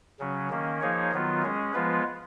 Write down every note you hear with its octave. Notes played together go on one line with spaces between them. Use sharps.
C#3 F#3 C#4
D#3 A#3 C#4
F3 A#3 D#4 G#4 C#5
D#3 F#3 B3 F4
G#3 C#4 G#4
F3 G#3 B3 F4 B4